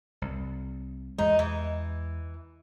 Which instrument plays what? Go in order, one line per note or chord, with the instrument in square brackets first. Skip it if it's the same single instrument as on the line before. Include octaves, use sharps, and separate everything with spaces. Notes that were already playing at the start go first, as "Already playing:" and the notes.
[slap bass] C2
[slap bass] E2 G#3 [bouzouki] D#4
[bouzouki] E3